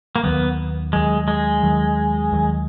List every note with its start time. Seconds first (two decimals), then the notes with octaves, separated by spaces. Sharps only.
0.16 A#3
0.23 D#2 D#3 F#3 B3
0.93 D#2 D#3 F#3 G#3
1.28 G#3
1.63 D#2 D#3 F#3
2.32 D#2 D#3 F#3